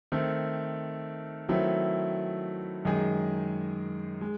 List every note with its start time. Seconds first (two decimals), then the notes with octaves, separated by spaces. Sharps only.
0.12 D#3 A3 C4
1.49 D#3 F#3 A3 C4 E4
2.85 F#2 D#3 G#3 D#4 G#4
4.21 G#3